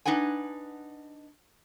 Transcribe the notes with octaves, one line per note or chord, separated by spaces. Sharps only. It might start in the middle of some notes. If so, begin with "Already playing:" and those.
D4 D#4 B4 F#5 G#5